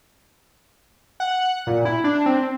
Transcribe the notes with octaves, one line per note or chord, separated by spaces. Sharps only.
F#5
A#2
E4
D4
C4